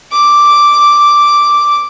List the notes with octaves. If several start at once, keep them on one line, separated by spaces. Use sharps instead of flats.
D6